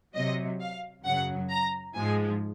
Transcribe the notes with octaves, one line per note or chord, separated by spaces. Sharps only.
C3 F#3 D#5
F5
F#2 C#3 F#3 F#5
A#5
G#2 F3 G#3 G#5